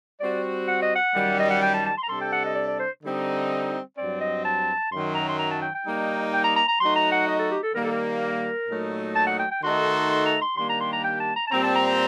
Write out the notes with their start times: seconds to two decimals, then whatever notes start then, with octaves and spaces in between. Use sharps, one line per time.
0.20 G3 C4 F#4 D5
0.68 F#5
0.82 D#5
0.95 F#5
1.14 F#2 D#3 G3
1.40 D#5
1.51 F#5
1.62 G5
1.74 A5
1.86 A5
1.98 C6
2.03 A#5
2.09 C3 G3 D4 A4 C6
2.21 G5
2.32 F#5
2.45 D#5
2.55 D5
2.67 D5
2.80 C5
3.03 D3 G3 C4 D#4
3.97 G2 F#3 C4 D5
4.21 D#5
4.45 A5
4.92 F#2 D#3 F#3 C6
5.15 A#5
5.29 C6
5.39 A#5
5.51 A5
5.62 G5
5.75 G5
5.86 G3 A#3 D#4
6.33 G5
6.44 A#5
6.56 A#5
6.68 A#5
6.80 F#3 A3 D#4 F#4 C6
6.96 A#5
7.12 F#5
7.28 D#5
7.39 A4
7.51 G4
7.63 A4
7.74 D#3 G3 A#3 A#4
7.84 A4
7.92 A#4
8.68 A#2 F#3 A3 D#4 F#4
9.15 A5
9.27 F#5
9.39 G5
9.51 G5
9.63 D#3 A3 D#4 F#4 A4 C6
10.10 C6
10.26 A#5
10.42 C6
10.57 D#3 G3 A#3 D4 G4 C6
10.69 A#5
10.81 C6
10.93 A#5
11.04 G5
11.20 A5
11.36 A#5
11.47 A5
11.51 A#2 G3 C4 A#5
11.63 A5
11.76 A#5
11.87 A#5